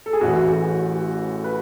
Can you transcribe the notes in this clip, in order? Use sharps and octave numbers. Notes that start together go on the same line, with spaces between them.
A4
G#4
A1 A2 E3 F#4
F#4
B4